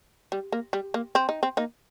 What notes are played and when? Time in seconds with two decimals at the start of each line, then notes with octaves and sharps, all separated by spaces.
0.32 G3
0.52 A#3
0.73 G3
0.94 A#3
1.15 C4
1.29 D#4
1.43 C4
1.57 A#3 D#4